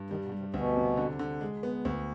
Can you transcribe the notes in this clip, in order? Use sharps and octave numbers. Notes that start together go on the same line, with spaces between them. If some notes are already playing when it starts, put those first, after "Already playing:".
Already playing: G2
D#2 D#3 G3
B2
G3
C3
D2 B2
C3
D3
D3
G#3
B3
D2